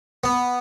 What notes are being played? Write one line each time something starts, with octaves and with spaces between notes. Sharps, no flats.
B3